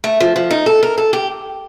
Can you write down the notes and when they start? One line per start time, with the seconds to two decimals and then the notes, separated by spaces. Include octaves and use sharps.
0.04 A3
0.20 F3
0.36 F3
0.51 D#4
0.66 A4
0.83 A#4
0.98 A4
1.13 G4